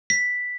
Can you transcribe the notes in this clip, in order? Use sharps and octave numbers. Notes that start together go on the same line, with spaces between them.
B6